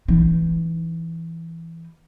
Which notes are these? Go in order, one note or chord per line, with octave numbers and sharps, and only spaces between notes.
E3 D#4